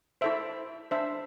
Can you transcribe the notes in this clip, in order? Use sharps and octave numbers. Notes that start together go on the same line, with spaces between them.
E4 A4 C5 E5
D4 C5 E5